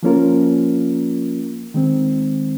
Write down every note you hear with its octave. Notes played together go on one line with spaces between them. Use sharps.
F3 A#3 C#4 F4 A#4
D#3 G#3 C4